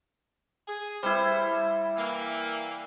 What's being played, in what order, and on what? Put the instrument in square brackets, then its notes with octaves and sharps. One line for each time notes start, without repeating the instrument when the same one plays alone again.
[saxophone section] G#4
[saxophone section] A2 E3 C5 [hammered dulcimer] G3 E4
[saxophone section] E3 A#3